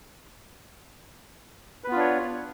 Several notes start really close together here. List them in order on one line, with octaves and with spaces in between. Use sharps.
B4 B3 F4 D4 C#5